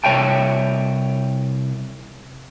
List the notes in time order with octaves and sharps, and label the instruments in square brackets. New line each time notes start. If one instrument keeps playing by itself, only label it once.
[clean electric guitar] C2 C#5 E5 G5 A5